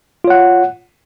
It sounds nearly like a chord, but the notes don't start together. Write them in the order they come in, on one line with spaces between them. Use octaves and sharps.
F4 C#5 F#5